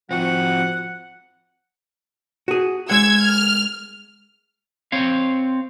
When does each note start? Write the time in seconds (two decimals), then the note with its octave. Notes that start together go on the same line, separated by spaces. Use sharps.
0.11 F3 C4 F#4 F#5
2.48 F#4 G#4
2.90 G#3 F#5 E6 G#6
3.22 F6
4.92 C4 C#5 F5